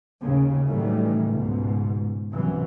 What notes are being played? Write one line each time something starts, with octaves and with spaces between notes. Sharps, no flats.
D#2 C#3
A2 D#3 E3 F#3 G3 A3
C#2 G#2 B2
C2 F#2 B2 E3